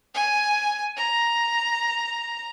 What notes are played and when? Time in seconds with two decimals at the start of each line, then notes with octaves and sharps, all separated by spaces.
0.14 G#5
0.97 A#5